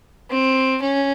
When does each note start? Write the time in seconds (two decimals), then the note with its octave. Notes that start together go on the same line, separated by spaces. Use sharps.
0.30 C4
0.82 C#4